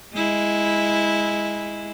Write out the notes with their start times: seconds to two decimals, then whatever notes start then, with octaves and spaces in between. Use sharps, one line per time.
0.13 G#3 E4